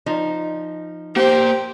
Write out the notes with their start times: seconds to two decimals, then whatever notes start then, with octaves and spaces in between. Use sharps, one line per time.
0.06 F3 D#4
1.16 A#3 G4 C5 C6